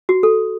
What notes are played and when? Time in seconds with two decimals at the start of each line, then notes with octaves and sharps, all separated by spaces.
0.09 F#4
0.23 A4